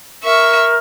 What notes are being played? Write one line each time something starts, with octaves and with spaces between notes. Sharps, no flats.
A#4 E5 C#6